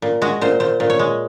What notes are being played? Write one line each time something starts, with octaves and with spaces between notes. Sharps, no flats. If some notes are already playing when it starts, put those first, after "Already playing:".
A#2
G#3 F#4
A#2 C5
A#2 C5
A#2
C#5
G#3